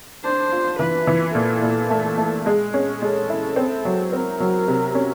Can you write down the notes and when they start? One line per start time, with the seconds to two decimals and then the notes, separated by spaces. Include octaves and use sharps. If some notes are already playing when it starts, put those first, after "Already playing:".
0.24 D4 C5
0.52 F4
0.79 E3 B4
1.07 E3
1.35 A#2 A4
1.62 A#2
1.90 A3
2.18 A3
2.46 G#3 G#4
2.74 C#4
3.02 G#3 A4
3.30 E4
3.56 C4
3.85 F#3
4.12 C4 A#4
4.40 F#3
4.68 C3
4.95 C#4